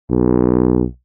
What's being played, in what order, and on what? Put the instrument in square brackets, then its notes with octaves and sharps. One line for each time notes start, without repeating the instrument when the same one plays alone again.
[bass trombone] B1